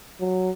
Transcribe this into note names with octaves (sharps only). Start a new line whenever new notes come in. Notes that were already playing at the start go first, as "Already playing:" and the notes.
F#3